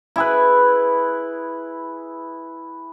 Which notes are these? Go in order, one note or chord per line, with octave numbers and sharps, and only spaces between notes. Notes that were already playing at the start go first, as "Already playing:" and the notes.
E4 G#4 B4